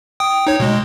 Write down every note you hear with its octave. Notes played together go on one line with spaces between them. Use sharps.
G5 D#6
D#4 C#5
B2 G#3